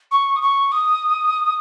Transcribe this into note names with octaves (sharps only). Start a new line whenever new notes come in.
C#6
D#6
C#6
D#6